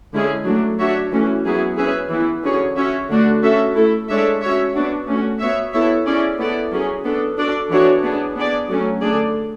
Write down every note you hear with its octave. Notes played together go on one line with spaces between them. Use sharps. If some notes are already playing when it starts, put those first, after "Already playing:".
D3 G#3 C#4 E4 G#4
F#3 A3 D4
D4 F#4 C#5 E5
E3 A3 C#4 F#4
F#3 B3 E4 G#4
C#4 G#4 B4 E5
E3 B3 E4
D3 F#3 C#4 G#4 C#5
C#4 F#4 C#5 E5
D3 A3 D4 F#4 A4
C#4 F#4 A4 E5
A3 E4 A4
G#3 D4 A4 C#5 E5
C#4 F#4 C#5 E5
B3 D4 F#4
A3 C#4 F#4
B3 F#4 C#5 E5
B3 E4 A4 C#5 E5
C#4 E4 G#4 D5
B3 E4 A4 D5
F#3 C#4 G#4
B3 D4 A4
D4 F#4 A4 D5
E3 B3 D4 F#4 C#5
B3 D4 G#4
B3 D4 G#4 D5
F#3 A3 C#4
D3 A3 D4 G#4 D5